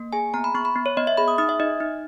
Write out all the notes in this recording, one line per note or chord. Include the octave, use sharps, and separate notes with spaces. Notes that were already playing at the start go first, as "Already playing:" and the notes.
Already playing: A#3
G#4 G#5
B3 A#5
B5
B3 C#6
B5
B3
C#5
B3 D#5
E5
G#4 B5
D#6
D#4 D#6
E5
D#4 D#5
D#4